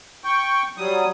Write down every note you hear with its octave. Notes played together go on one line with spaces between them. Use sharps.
G5 C#6
F#3 G3 D#6